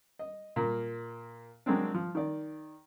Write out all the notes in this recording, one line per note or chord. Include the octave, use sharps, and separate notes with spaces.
D#5
A#2 A#3
F#3 G#3 A#3 C4 D4
F3
D#3 D5